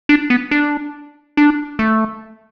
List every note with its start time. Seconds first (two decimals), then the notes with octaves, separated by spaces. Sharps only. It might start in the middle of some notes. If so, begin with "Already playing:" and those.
0.09 D4
0.30 B3
0.51 D4
1.37 D4
1.79 A3